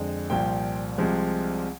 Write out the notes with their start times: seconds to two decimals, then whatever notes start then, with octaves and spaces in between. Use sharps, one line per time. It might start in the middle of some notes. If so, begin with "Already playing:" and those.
Already playing: F2 D3 G#3
0.30 C2 A#2 F3 G5
0.98 C2 C3 F3 G#3